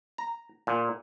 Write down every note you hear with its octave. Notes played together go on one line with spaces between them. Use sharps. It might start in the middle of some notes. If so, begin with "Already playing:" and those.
A#5
A#2